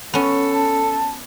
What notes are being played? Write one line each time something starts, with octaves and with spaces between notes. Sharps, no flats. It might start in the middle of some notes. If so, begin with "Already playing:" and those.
B3 C#4 A4
A5